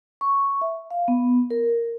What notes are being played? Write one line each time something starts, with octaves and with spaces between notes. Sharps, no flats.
C#6
E5
F5
B3
A#4